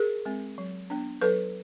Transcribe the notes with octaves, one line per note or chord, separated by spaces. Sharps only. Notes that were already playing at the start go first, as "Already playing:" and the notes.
Already playing: G#4 A#4
G#3 C4
F#3
B3 D4
F#3 A4 B4